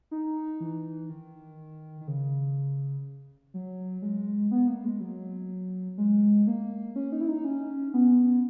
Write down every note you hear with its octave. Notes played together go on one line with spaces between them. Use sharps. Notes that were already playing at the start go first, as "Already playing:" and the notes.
D#4
E3
D#3
D#3
C#3
F#3
G#3
B3
A#3
G#3
F#3
G#3
A#3
C#4
D#4
E4
D#4
C#4
B3